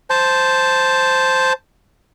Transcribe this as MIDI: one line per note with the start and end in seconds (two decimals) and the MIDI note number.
0.10 1.53 72
0.10 1.53 81